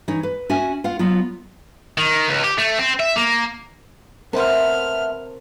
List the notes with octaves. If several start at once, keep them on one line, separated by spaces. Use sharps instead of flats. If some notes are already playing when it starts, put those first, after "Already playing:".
E3 D#4 C#5
B4
C#4 F#4 E5 G#5
F4 F5 F#5
F#3 B3 F4
D#3
C#2
G4
A3
C4
E5
A#3
A3 B3 C4 A#4 C5 E5 A5 F6